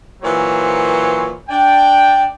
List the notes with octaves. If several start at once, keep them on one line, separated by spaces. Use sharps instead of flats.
A#2 E3 F#3 C5 C#5
D4 G5